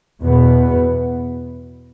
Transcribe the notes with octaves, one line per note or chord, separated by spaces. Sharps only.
E2 B2 B3